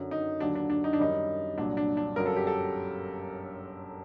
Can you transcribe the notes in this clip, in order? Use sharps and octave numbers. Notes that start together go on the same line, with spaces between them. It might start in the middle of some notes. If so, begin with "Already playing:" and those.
Already playing: F#2 D3 F#3
D#4
D#2 D3 F#3 D4
D4
D4
D#4
D4
F#2 D#3 G3 D#4
C2 A#2 F#3 D4
D4
D4
G1 F#2 F#3 A#4
A4
G4
A4